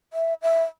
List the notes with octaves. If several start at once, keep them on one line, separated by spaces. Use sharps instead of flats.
E5
E5